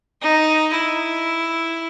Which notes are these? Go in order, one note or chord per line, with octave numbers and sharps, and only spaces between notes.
D#4
E4